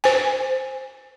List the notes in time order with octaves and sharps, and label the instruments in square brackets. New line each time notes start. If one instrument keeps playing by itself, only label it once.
[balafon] C5 G#5